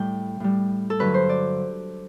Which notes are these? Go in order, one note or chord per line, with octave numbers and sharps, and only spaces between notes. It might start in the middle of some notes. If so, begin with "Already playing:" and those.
Already playing: A2 G3 G5
A2 G3
A4
G2 D3 F#3 B4
C5
D5